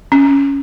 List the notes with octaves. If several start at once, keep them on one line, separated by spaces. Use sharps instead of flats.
C#4